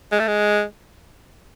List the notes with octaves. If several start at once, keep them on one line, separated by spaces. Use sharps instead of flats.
G#3
A3
G#3